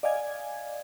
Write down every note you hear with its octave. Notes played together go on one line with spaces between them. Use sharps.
D5 D#5 F5 G#5 G#6